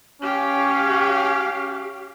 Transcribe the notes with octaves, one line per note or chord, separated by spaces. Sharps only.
C#4 G4 F5